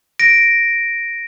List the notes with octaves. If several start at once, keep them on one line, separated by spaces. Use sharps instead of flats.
A#6 D7